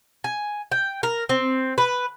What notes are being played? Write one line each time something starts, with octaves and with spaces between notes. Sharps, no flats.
G#5
G5
A#4
C4
B4